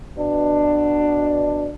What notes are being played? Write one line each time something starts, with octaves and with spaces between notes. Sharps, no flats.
B2 D4